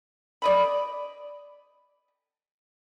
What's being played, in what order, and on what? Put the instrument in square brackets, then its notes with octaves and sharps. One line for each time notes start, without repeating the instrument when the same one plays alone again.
[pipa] D5 D#5 B5